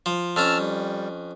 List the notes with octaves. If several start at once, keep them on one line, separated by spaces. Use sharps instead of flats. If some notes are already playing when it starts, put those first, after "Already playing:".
F3
F2 C#4 A5 E6 F6
G3